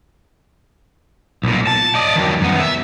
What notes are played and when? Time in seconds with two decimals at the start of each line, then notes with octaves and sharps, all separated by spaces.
1.43 B1 A#2
1.67 A5
1.95 D5 D#5
2.15 D#3 F#3
2.41 F#2 B3
2.60 E5